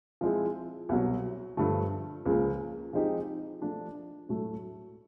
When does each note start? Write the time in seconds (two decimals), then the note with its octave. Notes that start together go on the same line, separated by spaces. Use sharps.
0.21 F3 G#3 C4 E4
0.89 C2 B2 F#3
1.57 G2 D3 F3 A3
2.26 C#2 C#3 F3 A#3
2.93 F3 G#3 C4 D#4 G4
3.62 F3 A3 D4
4.29 A2 F#3 A3